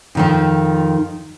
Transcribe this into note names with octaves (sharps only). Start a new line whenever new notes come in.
F2 D#3 F3